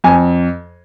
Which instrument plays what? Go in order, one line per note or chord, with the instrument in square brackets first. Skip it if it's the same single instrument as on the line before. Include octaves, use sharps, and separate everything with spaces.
[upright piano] F2 G#5